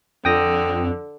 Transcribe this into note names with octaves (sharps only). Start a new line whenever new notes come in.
F2 D3 G5 D#6 A#6